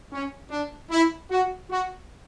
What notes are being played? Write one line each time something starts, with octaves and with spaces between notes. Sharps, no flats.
C#4
D4
E4
F#4
F#4